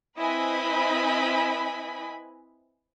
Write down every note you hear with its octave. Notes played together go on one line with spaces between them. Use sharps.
C4 E4 B4 D#5 G#5 B5